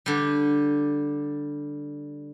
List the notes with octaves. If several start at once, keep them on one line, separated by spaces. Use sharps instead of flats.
D3 G3